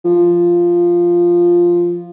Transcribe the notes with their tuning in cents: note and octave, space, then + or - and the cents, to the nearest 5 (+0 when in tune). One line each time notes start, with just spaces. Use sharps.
F3 -5